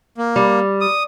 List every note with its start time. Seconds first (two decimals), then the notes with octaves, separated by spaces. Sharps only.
0.18 A#3
0.36 G3
0.81 D#6